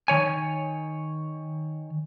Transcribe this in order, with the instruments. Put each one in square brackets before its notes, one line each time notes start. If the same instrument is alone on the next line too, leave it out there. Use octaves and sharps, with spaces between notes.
[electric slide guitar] D#3 C#5 G#5